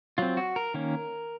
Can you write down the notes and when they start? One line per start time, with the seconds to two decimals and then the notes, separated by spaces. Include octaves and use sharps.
0.18 F#3 C4 F4
0.37 F#4
0.56 A#4
0.74 D#3 A#3 C#4